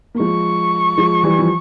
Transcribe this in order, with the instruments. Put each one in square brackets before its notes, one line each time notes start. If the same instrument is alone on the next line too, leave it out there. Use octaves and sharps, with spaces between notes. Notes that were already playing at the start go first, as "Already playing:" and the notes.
[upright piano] A#3
[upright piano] F3 G#3 [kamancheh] C#6
[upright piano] F3 G#3
E3 G3
F3